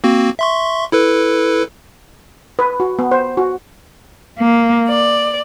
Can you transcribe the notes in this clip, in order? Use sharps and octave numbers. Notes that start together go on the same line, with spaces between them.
A#3 C4 F#4
E5 C6 C#6
E4 A4 B4
B4
F#4
B3
C5
F#4
A#3
D5